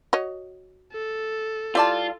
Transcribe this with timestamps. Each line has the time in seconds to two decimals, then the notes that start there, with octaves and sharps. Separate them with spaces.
0.13 F#4 C#5 D#5
0.92 A4
1.75 G3 E4 F4 D5 A5